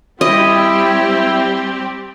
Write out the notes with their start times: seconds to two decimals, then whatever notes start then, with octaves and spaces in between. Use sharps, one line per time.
0.21 G3 C4 E4 G4 D#5